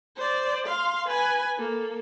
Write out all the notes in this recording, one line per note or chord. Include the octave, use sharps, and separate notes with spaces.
C5 D5
F5 C6
B4 G#5
A#3 A4